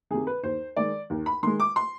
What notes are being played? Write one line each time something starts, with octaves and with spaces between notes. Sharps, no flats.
C3 D#3 G#4
B4
D#2 C5
D#3 G#3 D5
D#2
B5
D#3 G#3 C6
D6
C6